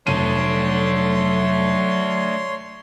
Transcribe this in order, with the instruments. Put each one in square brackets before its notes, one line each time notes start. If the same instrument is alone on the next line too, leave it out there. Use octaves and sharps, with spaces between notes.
[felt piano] F1 D#7 [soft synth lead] F#3 [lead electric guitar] A3 D4 [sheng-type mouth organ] C#5 C6